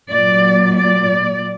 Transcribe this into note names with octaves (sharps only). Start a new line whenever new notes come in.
A#2 F#3 D5
D5